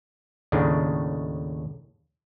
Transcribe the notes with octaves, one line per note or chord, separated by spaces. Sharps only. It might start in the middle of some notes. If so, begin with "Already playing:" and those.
D#2 A2 C#3 D4 D#4